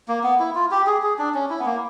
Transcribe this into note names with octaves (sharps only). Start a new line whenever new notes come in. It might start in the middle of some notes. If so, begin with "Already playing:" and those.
A#3
B3
E4
F4
G4
G#4
G#4
D4
C#4
E4
B3
A#3